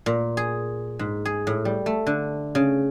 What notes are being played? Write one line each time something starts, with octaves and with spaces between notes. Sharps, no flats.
A#2
G#4
G#2
G#4
A2
G3
A3
D3
C#3